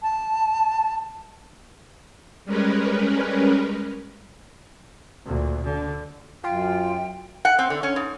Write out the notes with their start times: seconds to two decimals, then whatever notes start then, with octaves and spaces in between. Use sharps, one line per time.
0.02 A5
2.45 G3 G#3 C#4 A#4 B4
5.26 D2 A#2
5.64 D3
6.44 F#2 F4 G5
7.45 F#5
7.59 C4
7.70 D3
7.83 C#4
7.96 G#2